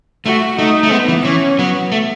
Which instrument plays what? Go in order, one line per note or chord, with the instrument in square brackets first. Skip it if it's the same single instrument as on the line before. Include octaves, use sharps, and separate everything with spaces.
[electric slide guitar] A3 [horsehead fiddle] F#4
[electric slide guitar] A3 [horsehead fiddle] D#4
[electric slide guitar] A3
[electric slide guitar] G#3 [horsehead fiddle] B3
[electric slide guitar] E3
[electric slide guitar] E3 [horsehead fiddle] C#4
[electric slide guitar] F#3 [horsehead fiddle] B3
[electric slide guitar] A3